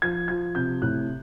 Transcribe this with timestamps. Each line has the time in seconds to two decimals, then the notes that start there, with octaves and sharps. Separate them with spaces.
0.02 F3 G#6
0.28 F3 G#6
0.55 C3 G6
0.82 A2 F#6